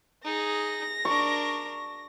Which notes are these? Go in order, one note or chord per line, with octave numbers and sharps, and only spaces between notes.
D#4 G#4 A#6
D4 A#4 C#6